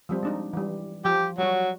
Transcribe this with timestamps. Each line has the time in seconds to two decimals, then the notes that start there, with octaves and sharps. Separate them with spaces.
0.09 F3 G3 C4
0.23 G#3 D4 D#4
0.53 E3 G3
1.05 F3 G4
1.38 F#3 G3 F#4